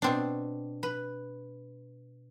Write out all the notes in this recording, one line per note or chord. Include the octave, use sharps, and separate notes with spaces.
B2 C4 D4
B4